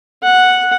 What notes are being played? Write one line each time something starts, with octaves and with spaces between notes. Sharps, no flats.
F#5